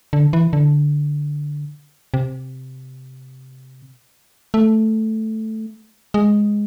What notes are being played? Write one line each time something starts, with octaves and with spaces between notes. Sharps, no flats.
D3
E3
D3
C3
A3
G#3